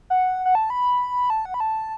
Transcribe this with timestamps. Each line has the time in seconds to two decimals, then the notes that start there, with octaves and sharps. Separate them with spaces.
0.10 F#5
0.45 F#5
0.55 A5
0.70 B5
1.30 A5
1.45 F#5
1.54 B5
1.60 A5